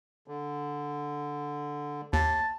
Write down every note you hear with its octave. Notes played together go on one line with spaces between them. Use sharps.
D3
D#2 A5